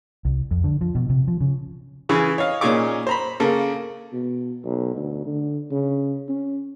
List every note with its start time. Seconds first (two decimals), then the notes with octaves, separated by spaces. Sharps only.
0.25 C2
0.51 F2
0.64 D3
0.81 F3
0.95 B2
1.09 C3
1.28 F3
1.41 C#3
2.09 C#3 E3 G#4 C#6
2.38 C#5 D#5 F5
2.61 A#2 C#4 D#4 G#4 C#6 D6
3.07 C5 A#5 B5
3.40 C#3 A#3 A4
4.13 B2
4.64 B1
4.96 D2
5.26 D3
5.71 C#3
6.29 C#4